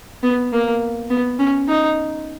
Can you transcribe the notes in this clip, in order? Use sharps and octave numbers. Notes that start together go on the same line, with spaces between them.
B3
A#3
B3
C#4
D#4